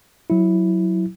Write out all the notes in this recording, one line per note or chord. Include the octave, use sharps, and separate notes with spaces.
F#3 E4